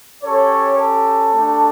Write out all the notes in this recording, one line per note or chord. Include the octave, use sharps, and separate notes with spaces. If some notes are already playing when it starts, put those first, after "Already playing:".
C#4 G4 A4 C#5
A4
A3 D4 G4